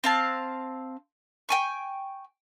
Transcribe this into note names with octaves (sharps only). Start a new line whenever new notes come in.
C4 F5 A5
G5 G#5 C#6